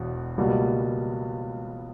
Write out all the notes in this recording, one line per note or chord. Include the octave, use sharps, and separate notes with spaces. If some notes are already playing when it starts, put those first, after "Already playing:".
Already playing: E1 E2 B2
C#2 B2 G3 A#3